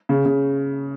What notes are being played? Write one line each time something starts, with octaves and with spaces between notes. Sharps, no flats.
C#3
C#3